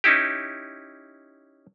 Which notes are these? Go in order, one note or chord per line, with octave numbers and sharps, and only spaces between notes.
C#4 D#4 E4 G4